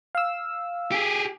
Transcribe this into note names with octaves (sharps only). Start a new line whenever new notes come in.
F5 E6
G4 G#4